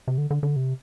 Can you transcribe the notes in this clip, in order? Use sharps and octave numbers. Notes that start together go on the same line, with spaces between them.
C3
D3
D3
D3
C3